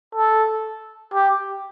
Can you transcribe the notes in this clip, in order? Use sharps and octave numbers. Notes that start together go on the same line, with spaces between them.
A4
G4